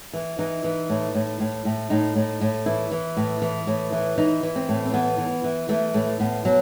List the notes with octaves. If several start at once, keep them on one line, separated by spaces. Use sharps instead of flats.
E3
E3 D#4
E3
A2
A2
A2
A2
A2 D#4
A2
A2
E3 E4
E3
A2
E3
A2
E3
E3 D#4
E3
C4
A2
C4
E3 B3
E3
E3
E3 A3
A2 A3
A2 B3
B2 F#3